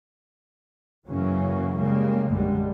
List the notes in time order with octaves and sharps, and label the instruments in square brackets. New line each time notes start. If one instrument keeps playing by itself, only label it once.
[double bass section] F#2 C#3 E3 F#3 A#3 C#4
C#3 G3 G#3 A#3
A#1 F#2 D3 G3 G#3